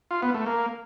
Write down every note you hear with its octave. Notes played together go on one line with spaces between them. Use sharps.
F4
B3
A3
A#3